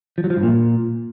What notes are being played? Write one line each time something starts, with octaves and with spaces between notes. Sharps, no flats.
F3
F#3
F3
G2
A#2